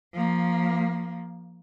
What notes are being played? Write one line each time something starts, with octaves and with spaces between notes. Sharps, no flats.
F3 A#3